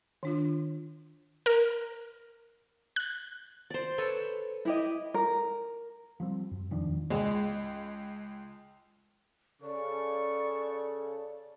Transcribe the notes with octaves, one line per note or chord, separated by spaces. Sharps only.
D#3 D4 F4
A#4
F#6
C5 D5
A4 B4 C#5
E4 G4 D#5
A#4
F3 G3 C4
F#2
E1 D#3 F3 D4
C#2 G#3
C#3 A4 D5 C#6